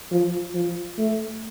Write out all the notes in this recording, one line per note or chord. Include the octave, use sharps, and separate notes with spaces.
F3
F3
A3